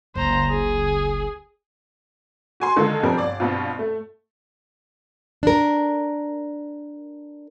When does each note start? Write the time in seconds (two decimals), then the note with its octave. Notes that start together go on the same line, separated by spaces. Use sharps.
0.15 F#1 C#2 C5 A#5
0.50 G#4
2.60 F#4 G#5 C6
2.76 D3 D#3 G#3 D#4 F4 A4
3.03 B2 F3 G3 C4 D4 A#4
3.18 G1 D5 D6
3.40 G2 B2 B3 C4 F4
3.79 A3
5.43 D4 A#4